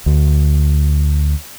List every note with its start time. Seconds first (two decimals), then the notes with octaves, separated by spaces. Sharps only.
0.06 D2